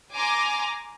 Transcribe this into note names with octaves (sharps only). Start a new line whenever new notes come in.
G#5 A#5 C6 D6